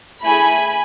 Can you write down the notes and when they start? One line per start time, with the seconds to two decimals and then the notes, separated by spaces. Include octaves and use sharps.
0.23 A3 E4 G#4 G#5 B5